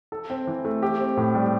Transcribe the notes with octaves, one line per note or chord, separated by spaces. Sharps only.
A4
C4
E3
A3
G4
C4
A2
G3